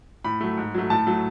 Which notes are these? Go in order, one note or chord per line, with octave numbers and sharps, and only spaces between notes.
A2 B5
F#3 A3
G#2
F#3 A3
A2 A5
F#3 A3